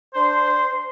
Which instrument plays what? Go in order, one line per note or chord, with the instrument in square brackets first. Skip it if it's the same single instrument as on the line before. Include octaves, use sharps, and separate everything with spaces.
[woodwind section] D4 C5